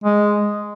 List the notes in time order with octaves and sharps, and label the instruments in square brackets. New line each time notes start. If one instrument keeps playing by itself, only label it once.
[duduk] G#3